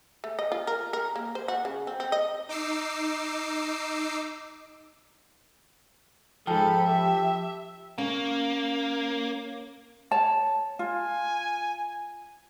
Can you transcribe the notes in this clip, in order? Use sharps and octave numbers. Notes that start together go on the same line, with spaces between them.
A3
D#5
F4
A#4
A#4
A#3
C5
F#4
C#3
C4
C4
D#5
D#4 D6 E6 C7
G#2 F3 A4 G5 A5 B5
G4 E5
A#3 C#4
C#5 A5
F4 G#5